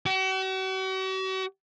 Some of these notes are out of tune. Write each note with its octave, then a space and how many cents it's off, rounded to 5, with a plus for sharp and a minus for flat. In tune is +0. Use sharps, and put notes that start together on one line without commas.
F#4 +45